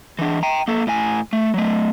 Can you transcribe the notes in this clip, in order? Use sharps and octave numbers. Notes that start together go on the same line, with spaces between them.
E3 D4
G5 A#5
A#3 A4
A2 G#5
A3
F#3 A3